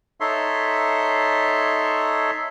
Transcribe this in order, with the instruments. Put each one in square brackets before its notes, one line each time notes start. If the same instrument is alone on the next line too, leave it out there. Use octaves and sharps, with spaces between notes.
[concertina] D#4 A4 C#5 E5 C6